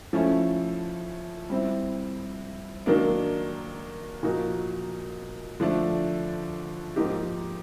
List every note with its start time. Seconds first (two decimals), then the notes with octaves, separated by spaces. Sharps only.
0.13 F3 A3 C#4 E4
1.50 G3 C4 E4
2.86 D#3 F#3 A#3 D4
4.23 A#2 F3 A#3 D#4 F#4
5.60 D3 F3 A3 D4
6.96 G#2 F3 A#3 D#4 G4